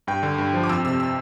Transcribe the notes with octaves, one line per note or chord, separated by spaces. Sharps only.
G2 G5
D3
G2
F3
D6
F2 E6
C3 E6
E6